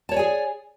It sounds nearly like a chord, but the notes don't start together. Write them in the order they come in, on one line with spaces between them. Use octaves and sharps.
A5 C#5 D5 G#5 G#4